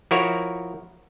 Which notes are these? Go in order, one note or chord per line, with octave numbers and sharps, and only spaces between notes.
F3 E4 F#4 A#4 C#5